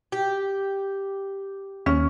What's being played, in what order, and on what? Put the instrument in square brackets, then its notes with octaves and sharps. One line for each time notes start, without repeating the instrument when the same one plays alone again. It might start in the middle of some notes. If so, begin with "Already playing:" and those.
[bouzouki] G4
[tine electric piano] D#2 [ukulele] C#4